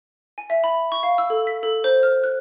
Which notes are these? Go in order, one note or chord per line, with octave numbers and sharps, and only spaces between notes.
G#5
E5
B5
C#6
F5
E6
A4
B6
A4
C5
F6
F#6